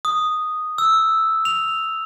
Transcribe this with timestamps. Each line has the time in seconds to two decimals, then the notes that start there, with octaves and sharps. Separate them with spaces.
0.05 D#6
0.78 E6
1.45 F7